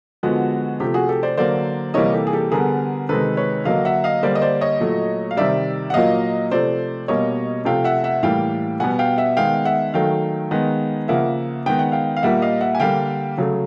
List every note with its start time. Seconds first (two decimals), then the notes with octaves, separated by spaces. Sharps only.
0.23 D3 F3 G#3 B3 F#4
0.80 C3 F3 A3 G4
0.94 F#4 G#4
1.09 G4 A4
1.23 C5 D5
1.37 D3 F#3 A#3 C5 D5
1.94 C3 E3 G3 A#3 C#5 D#5
2.13 G4 A4
2.27 G#4
2.33 G4 A4
2.52 D3 G3 B3 G#4 A#4
3.09 C3 D#3 G#3 A4 B4
3.37 B4 C#5
3.65 D3 F#3 A#3 D#5 F5
3.85 E5 F#5
4.04 D#5 F5
4.23 D3 G3 A#3 C5 D5
4.35 D#5
4.42 C5 D5
4.61 C#5 D#5
4.80 A#2 F#3 A3
5.31 F5
5.37 C3 D#3 G3 D5 E5
5.90 F#5
5.94 A#2 F#3 A#3 D#5 F5
6.51 C3 F3 A3 C5 D5
7.08 B2 G3 A#3 C#5 D#5
7.65 C3 F3 A3 F5 G5
7.84 E5 F#5
8.04 E5 F#5
8.23 A2 E3 G3 A#3 F5 G5
8.80 B2 G3 B3 F#5 G#5
8.99 F5 G5
9.18 E5 F#5
9.37 D#3 G#3 B3 F5 G5
9.65 E5 F#5
9.94 D#3 F#3 A3 F5 G5
10.51 D#3 G#3 B3
11.08 C#3 F3 A#3 E5 F#5
11.66 D#3 G#3 B3 G5
11.79 F#5
11.92 F5 G5
12.17 F5
12.23 A#2 G3 A#3 E5 F#5
12.42 D#5 F5
12.61 E5 F#5
12.75 G#5
12.80 D3 G3 A#3 F5 G5
13.38 C#3 F#3 A3